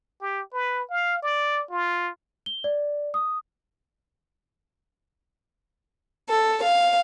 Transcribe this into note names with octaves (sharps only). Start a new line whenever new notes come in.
G4
B4
F5
D5
F4
G7
D5
D#6
A4
F5